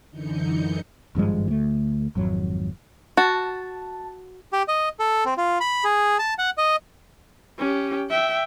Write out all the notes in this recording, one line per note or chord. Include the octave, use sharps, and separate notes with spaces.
F#2 D3 E3 D#4 G6 C#7
G#1 G2 F3 G#3
D2 A3
G#1 F2 F#3
F#4 A5
G4
D#5
A4
C4
F4
B5
G#4
A5
F#5
D#5
C#4 G4
E5 G5